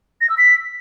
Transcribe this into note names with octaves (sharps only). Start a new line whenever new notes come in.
A#6
E6
B6